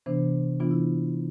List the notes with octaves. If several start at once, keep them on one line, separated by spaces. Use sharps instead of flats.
C3 E3 B3 D4 C5
C3 E3 B3 D4 F4
E4